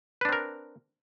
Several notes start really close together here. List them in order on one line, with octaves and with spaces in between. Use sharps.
B4 D4 C4 A#4